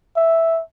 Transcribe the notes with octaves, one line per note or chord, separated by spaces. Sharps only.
E5